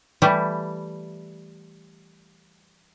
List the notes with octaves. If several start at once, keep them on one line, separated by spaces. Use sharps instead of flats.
E3 G3 A3